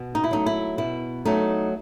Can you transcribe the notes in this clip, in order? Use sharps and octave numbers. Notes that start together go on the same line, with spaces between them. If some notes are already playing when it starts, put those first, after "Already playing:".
Already playing: B2
D#4
E4
F#3 A3 D#4
E4
B2 E4
F#3 A3 D#4